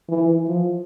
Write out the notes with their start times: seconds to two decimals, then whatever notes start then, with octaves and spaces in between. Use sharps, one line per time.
0.09 E3
0.47 F3